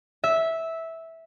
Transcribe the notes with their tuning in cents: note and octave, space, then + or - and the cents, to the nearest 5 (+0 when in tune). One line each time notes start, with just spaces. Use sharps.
E5 -10